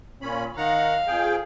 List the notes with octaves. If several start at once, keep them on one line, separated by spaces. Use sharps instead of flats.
A#2 C#4 B5
D#3 F5 F#5 A#5
F2 G#4 G5